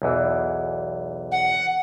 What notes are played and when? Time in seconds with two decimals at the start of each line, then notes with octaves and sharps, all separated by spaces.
0.02 B1 E2 E3
1.31 F#5